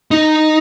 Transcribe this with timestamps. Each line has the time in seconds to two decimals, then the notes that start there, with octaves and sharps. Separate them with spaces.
0.11 D#4